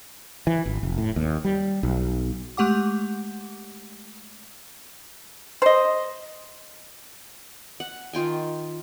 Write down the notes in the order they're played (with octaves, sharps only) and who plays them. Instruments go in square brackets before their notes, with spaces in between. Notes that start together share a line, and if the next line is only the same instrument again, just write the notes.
[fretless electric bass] E3
G#1
F1
A2
D#2
G3
B1
[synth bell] G#3 A3 G4 F#5 D6
[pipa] C5 D#5
[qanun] F#5
D#3 F4 G5 G#5